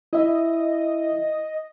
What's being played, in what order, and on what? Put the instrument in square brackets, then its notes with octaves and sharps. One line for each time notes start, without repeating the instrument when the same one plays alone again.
[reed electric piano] E4 E5 [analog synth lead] D#5